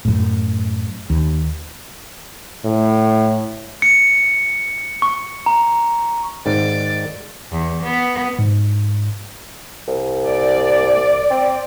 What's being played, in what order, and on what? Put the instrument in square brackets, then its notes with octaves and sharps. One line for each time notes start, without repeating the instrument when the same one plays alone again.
[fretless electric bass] F#2 A2
D#2
[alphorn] A2
[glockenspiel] C#7
C#6
A#5
[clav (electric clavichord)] G#2 D#3 [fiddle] D5
[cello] E2
B3
[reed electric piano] G#2
[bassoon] C2
[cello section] D5
[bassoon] C4